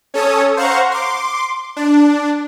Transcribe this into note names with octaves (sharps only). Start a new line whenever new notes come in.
C#4 A4 C#5 D#6
C5 F5 F#5 A#5 C#6
C6 D6
D4